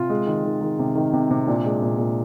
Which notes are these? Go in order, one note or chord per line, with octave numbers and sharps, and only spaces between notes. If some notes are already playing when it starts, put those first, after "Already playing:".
Already playing: C3 F4
G#3
D#3
D#3
D#3
C3
D#3
C3
C3
A#2 D4
G#3
A#2
A#2